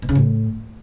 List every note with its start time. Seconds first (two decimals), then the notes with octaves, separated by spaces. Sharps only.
0.02 B2
0.09 C#3
0.15 A2